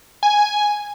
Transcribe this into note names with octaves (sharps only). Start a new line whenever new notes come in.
G#5